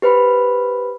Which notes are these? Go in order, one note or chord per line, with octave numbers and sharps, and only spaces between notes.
G4 B4 C5 B5